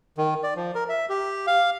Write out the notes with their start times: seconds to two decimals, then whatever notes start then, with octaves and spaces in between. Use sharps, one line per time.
0.18 D#3
0.43 D5
0.56 F3
0.75 A#4
0.89 E5
1.09 G4
1.47 F5